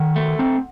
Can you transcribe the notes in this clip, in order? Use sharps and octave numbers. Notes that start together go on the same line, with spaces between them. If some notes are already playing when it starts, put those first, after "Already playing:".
Already playing: D#3 F#5
A3
C4